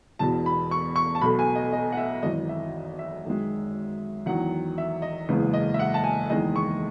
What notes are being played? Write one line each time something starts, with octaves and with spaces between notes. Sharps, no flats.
E1 E2 B2 A5
B5
C#6
C#6
A5
B1 B2 A3 B5
G#5
D#5
D#5
F#5
E5
G#1 F#2 E3 D#5
E5
E5
F#2 D#3 G#3
E2 D#3 F#3 F#5
E5
D#5
F#1 E2 C#3 G#3 B3
D#5
E5
F#5
A5
G#5
F#1 E2 D#3 G#3 D#5
C#6